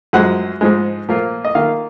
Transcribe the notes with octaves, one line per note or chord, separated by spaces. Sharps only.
F#2 F3 G#3 F#5
G#2 F3 G#3
A#2 F3 A#3 F4
D#5
D#3 A#3 F4 F5